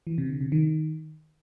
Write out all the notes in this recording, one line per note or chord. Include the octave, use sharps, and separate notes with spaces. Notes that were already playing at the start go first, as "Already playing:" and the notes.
E3
C3
D3
C3
D#3